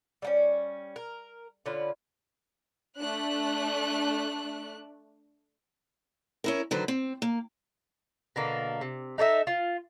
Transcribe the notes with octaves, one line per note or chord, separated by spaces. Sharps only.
G3 A#3 C#4
A#4
D3 C#4 F4 B4
A3 D4 F#6
C#4 E4 A#4
D3 D#3 F#3 B4 C5
C4
A#3
B2 D3 A#3
C3
D#4 A4 C#5 E5
F4